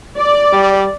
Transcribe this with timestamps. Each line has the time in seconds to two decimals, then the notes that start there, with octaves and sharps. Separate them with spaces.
0.17 D5
0.53 G3